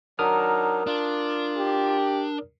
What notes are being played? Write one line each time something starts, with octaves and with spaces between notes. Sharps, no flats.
F#3 D4 D#4 A#4 D#6 F6
D4 F4
G4